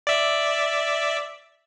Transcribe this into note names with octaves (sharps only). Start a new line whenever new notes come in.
D5 E5